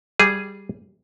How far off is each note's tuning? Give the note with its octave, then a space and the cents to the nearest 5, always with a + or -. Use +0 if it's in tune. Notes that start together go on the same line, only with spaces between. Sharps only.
G3 +0 G#4 +0